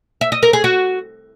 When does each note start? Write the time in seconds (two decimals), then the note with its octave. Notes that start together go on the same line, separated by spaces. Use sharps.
0.21 E5
0.32 D#5
0.43 A#4
0.53 G#4
0.64 F#4